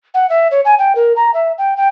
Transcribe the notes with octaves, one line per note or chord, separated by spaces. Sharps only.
F#5
E5
C#5
G#5
G5
A#4
A#5
E5
G5
G5